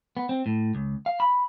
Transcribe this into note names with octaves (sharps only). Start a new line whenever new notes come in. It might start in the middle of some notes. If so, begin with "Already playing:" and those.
B3
C4
A2
C#2
F5
B5